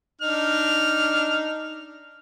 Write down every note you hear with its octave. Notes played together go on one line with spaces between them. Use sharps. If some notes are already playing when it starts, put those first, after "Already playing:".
D4 D#4 F6